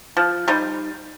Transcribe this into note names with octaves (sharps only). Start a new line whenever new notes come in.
F3
G3 D#4 C5